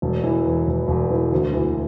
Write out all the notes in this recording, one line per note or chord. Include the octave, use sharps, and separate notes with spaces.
E1
E3
E2
E1
E1
E3
D2
E3